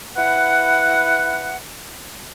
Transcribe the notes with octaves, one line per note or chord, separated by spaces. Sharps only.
E4 B4 F#5